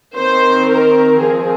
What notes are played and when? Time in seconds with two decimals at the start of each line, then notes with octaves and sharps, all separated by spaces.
0.16 D#3 C4 C5
0.70 A#4
1.24 F3 G#3 C4 G#4